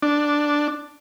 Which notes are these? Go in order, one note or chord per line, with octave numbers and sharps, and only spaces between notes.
D4